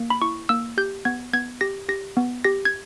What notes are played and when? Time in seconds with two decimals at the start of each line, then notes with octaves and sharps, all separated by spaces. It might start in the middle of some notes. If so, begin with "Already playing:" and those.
Already playing: A#3
0.10 B5
0.22 E4 C#6
0.49 A#3 E6
0.78 G4 G6
1.05 B3 G#6
1.33 B3 G#6
1.61 G4 A#6
1.89 G4 A#6
2.17 B3
2.44 G4 A#6
2.65 G#6